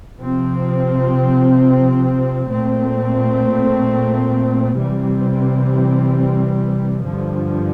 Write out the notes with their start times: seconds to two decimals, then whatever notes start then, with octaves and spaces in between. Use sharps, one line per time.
0.20 C3 F3 C4
2.48 A#2 A3 C4
4.76 C3 E3 G3 C4
7.03 G2 D3 F3